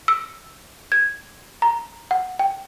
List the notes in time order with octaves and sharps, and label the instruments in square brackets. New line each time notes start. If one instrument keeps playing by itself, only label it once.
[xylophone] E6
G#6
A#5
F#5
G5